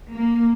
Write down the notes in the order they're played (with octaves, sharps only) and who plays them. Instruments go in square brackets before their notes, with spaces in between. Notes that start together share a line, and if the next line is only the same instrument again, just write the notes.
[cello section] A#3